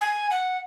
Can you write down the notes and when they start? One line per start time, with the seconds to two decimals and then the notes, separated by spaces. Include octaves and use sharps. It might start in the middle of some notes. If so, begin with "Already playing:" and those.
0.01 G#5
0.31 F#5